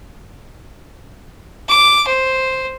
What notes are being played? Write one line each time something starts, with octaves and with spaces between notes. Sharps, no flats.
D6
C5